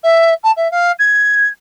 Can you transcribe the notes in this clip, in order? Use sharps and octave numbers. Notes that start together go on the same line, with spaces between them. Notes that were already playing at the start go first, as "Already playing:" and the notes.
E5
A5
E5
F5
G#6